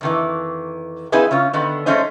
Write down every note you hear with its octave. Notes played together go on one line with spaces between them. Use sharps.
F2 D#3 E3
F3 C4 D#4 E4 G#4 B4
C#3 C#4 F4
D3 D#3 B3
F3 G#3 A3 C#4 D#4 C5